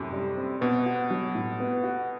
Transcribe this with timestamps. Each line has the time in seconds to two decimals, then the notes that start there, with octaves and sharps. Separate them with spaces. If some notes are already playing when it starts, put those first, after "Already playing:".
Already playing: F#2 A2 C3
0.13 G3
0.37 C4
0.61 B2 B3
0.86 F#4
1.10 F#3
1.35 A2
1.60 B3
1.84 F#4